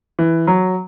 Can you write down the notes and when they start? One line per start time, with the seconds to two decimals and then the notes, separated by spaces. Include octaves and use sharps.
0.19 E3
0.47 F#3